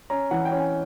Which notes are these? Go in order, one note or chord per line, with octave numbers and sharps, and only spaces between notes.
C#4 A#5
E3 F#5
G5
C#4
G#5